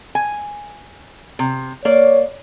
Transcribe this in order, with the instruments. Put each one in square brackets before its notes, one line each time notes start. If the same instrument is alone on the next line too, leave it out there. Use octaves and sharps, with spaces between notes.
[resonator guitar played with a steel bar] G#5
C3
[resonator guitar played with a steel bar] A#3 D5 [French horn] C#5